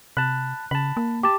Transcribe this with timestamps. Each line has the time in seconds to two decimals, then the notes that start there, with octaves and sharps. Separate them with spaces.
0.17 C3 A5 B5 F#6
0.71 C#3 A5 B5
0.97 A#3
1.23 G4 A5 D6